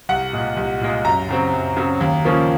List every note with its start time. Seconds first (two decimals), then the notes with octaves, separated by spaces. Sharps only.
0.09 C2 F#5
0.33 A#2 G#3
0.57 C2
0.81 A#2 G#3
1.05 F#2 A#5
1.29 C#3 F#3 C4
1.53 F#2
1.77 C#3 F#3 C4
2.01 D#2
2.25 C#3 F3 A#3 C#4